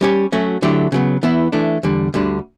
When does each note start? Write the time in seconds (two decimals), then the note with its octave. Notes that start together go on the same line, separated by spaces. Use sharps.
0.01 G3 C#4 G4 C#5
0.32 F#3 A3 C#4 F#4
0.62 D3 F#3 A3 E4 G4
0.92 C#3 F#3 B3
1.23 E3 B3 E4
1.52 E3 A3 D4
1.83 E2 D3 G3
2.14 D2 D3 G3 D4